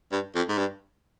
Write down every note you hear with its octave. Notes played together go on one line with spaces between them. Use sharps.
G2
F2
G#2
G2